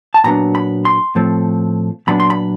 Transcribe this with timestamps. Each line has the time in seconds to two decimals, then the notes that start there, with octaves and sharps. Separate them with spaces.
0.14 A5
0.24 A#2 F#3 B3 D4 A#5
0.55 B5
0.85 C6
1.15 A2 F3 A3 C4
2.07 A#2 F#3 B3 D4 B5
2.20 C6
2.30 B5